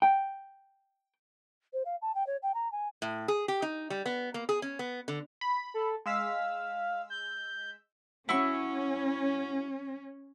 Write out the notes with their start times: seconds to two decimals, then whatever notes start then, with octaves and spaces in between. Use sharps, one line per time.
0.02 G5
1.73 C5
1.85 F5
2.02 A5
2.15 G5
2.27 C#5
2.43 G5
2.54 A#5
2.72 G#5
3.02 A2
3.28 G#4
3.48 G4
3.62 D#4
3.90 G3
4.06 B3
4.34 A#3
4.49 G#4
4.62 C#4
4.79 B3
5.08 D3
5.41 B5
5.74 A4
6.06 G#3 F5 E6 B6
7.10 G6
8.29 C#4 E4 F#4 C#6